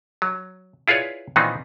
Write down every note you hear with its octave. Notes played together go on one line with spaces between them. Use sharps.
F#3
E4 F4 G#4 B4 C#5 D5
A#2 D#3 E3 B3 C4 D#4